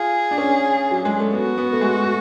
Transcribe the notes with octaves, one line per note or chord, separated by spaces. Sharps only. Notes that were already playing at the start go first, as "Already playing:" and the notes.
Already playing: F4 G#4
D4
C#4
F#3
G#3
A3
B3 F#4
B3
A3
G#3
A3